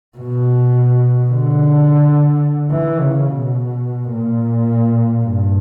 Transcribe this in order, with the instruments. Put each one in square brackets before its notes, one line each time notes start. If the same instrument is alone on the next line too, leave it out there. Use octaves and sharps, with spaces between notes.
[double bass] B2
D3
E3
C#3
B2
A#2
G2